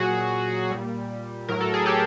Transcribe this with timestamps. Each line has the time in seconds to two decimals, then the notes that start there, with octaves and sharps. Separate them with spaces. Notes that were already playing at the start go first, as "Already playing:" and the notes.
Already playing: A#2 F#3 F#4 G#4
0.71 A#2 G3
1.48 A2 F#3 A#4
1.61 A4
1.74 G#4
1.86 G4 A4